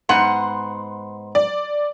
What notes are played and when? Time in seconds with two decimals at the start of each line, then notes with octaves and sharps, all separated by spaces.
0.09 G#2 B3 F#5 C6
1.35 D5